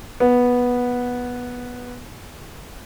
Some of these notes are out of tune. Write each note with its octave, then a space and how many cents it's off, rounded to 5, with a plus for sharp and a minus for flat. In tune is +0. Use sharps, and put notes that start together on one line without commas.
B3 -10